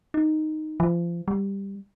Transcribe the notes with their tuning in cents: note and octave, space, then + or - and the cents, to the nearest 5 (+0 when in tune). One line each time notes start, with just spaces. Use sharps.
D#4 -5
F3 -30
G3 +10